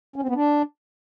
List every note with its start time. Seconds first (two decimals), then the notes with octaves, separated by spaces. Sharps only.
0.16 C#4
0.22 C4
0.29 B3
0.35 D4